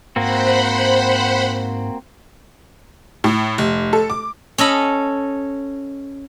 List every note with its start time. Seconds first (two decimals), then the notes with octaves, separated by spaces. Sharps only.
0.16 G#2 A#3 C4 F#4 C5 F#5 B5
3.24 A2
3.58 F1
3.93 A4
4.10 D6
4.58 C#4 A4 D#5 B5